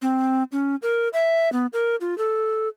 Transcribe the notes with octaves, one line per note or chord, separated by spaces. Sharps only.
C4
C#4
A#4
E5
B3
A#4
F4
A4